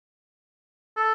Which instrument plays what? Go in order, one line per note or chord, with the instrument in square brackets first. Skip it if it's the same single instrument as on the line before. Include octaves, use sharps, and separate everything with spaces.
[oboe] A4